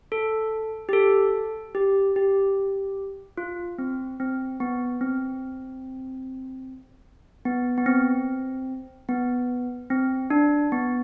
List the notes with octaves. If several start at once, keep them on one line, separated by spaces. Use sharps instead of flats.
A4
G4
A4
G4
G4
F4
C4
C4
B3
C4
B3
B3
C4
B3
C4
D4
B3